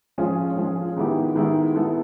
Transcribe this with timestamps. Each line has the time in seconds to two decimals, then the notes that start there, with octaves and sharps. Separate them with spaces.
0.18 F3 G#3 C#4 F4 G#4
0.57 F3 G#3 C#4 F4 G#4
0.96 D#3 G#3 B3 E4 G4
1.35 D#3 G#3 B3 E4 G4
1.75 G#3 B3 E4 A4